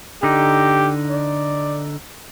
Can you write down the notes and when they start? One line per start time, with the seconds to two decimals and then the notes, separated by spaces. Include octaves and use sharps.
0.23 D3 D#4 G4
1.11 D5